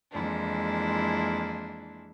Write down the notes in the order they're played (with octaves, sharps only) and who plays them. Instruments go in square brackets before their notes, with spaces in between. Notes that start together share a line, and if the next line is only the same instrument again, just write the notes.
[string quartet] F2 E3 G#3 A#3 D4 E4